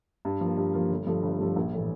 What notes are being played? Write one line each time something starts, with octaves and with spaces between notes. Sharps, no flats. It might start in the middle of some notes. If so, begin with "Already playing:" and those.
G2
F3 A#3
G2
F3 A#3
G1
G2 F3 A3
G1
G2 F3 A3
A#1
A2 E3